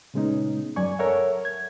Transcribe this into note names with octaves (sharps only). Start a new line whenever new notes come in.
A#2 C#3 G#3 B3 C#4 D#4
F#2 F#3 D5 G#5 C#6
A4 A#4 C#5 E5 F#5
G#6